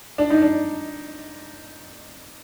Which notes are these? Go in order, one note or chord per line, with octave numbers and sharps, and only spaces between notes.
D4
D#4
D4